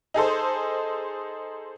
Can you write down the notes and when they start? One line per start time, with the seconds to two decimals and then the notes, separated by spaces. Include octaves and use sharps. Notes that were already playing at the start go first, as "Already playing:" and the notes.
0.14 D#4 G#4 A4 C5